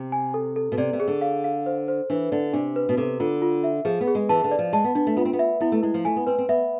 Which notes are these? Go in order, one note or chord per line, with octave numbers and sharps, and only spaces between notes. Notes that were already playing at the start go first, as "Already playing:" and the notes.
Already playing: C3
G#5
A4
A4
B2
C3 D5
C3
G#4
D3
F5
F5
C5
C5
E3 D4
D3 D5
C3 D4
B4
B2
C3 A4
D3 F4
F4
E5
F3 G#4
B3
G#4
G#3
E3 A5
D3
D5
F3
G#3 A5
B3
B3 D4
A3
B3 F4
C4
B3
E5
B3 E4
A3
G#3 E4
F3
A3 G#5
B3
C4 B4
C4
B3 E5